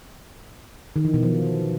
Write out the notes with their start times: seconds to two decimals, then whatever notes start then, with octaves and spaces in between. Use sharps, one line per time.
0.96 D#3
1.05 E3
1.14 B2
1.23 F3